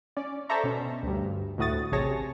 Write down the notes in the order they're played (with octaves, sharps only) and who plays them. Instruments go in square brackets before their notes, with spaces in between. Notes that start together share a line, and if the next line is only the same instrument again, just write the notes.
[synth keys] C#4 D5
A4 C5 D5 E5 A#5 C#6
B2 C#4
D2 G2
D2 A2 F#4 D#6 A6
A1 C3 G#4 C#5 A5 A#6